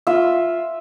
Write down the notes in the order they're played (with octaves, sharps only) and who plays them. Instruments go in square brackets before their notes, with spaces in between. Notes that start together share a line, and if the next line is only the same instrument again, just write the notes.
[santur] F4 E5